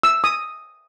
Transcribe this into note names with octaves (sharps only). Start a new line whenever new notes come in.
E6
D#6